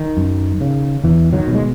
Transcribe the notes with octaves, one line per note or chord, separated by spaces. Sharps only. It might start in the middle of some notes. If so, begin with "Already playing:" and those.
Already playing: D#3
F#2
C#3
E2 E3
D#3 F#3
B2
G#3